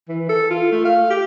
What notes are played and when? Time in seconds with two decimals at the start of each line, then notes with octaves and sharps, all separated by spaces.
0.09 E3
0.29 A4
0.50 F4
0.72 A3
0.85 F5
1.10 G4